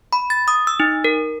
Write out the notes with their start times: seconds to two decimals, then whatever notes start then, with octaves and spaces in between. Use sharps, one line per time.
0.13 B5
0.30 A6
0.48 D#6
0.67 E6
0.80 D#4
1.04 A#4